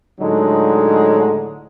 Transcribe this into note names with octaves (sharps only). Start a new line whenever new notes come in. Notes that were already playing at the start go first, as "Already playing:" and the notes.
A2 D3 F#3 G#3 D#4